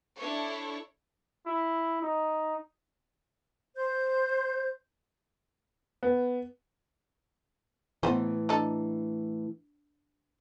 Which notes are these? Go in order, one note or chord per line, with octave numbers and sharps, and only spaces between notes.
D4 E4 A4 C#5
E4
D#4
C5 G6
B3
A2 E3 B3 D#4 C5
D4 D#4 A4